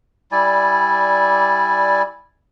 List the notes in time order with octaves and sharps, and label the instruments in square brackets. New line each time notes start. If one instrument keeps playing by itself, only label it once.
[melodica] G3 E4 D5 G#5